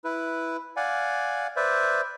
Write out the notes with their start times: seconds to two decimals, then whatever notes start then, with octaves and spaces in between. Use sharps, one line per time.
0.04 E4 B4
0.76 D5 F5 F#5 G#5
1.56 B4 C5 D5 E5